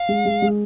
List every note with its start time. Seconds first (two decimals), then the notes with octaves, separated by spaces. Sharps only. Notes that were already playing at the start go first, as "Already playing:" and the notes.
Already playing: F5
0.09 G#3
0.25 G#3
0.42 G#3